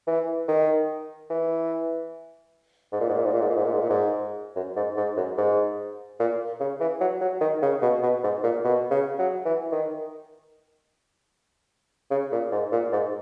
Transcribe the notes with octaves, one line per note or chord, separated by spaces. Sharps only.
E3
D#3
E3
G#2
A#2
G#2
A#2
G#2
A#2
G#2
A#2
G#2
A#2
G#2
A#2
G#2
F#2
G#2
G#2
F#2
G#2
A#2
C#3
E3
F#3
F#3
D#3
C#3
B2
B2
G#2
A#2
B2
C#3
F#3
E3
D#3
C#3
A#2
G#2
A#2
G#2